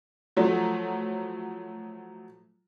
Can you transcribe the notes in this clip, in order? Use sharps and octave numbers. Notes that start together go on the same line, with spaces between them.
F3 F#3 A3